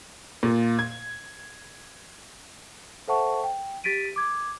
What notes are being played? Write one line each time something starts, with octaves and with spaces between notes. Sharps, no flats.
A#2
G#6
A4 C5 E5 F#5 A5 C#6
G5
G4 A6 B6 D7 D#7
D6 G#6